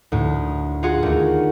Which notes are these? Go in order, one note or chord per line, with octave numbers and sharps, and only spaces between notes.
D2 A2
F4 F#4 G#4 F#5
D#2 A3